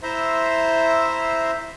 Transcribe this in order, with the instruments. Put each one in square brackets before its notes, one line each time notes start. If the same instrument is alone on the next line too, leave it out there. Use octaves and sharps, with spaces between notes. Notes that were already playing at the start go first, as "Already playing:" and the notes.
[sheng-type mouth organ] E4 C5 E5 A#5 C6